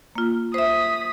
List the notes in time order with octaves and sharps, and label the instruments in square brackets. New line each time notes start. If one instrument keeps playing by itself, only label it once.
[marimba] A#3 F4
[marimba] C5 E5 [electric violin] D#6 B6